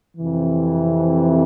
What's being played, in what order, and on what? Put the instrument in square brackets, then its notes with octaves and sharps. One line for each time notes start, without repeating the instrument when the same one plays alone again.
[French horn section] F2 C3 E3